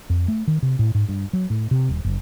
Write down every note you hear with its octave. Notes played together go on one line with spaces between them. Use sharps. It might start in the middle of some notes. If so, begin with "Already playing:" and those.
F2
A3
D#3
C3
A2
G#2
G2
F#3
A2
C3
D#1
F#1